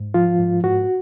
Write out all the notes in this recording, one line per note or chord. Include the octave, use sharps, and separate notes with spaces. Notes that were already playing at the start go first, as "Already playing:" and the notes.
Already playing: G#2
F3 F4
G#2
G#2 F#4